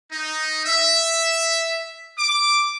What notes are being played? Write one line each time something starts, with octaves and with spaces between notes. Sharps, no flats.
D#4
E5
D6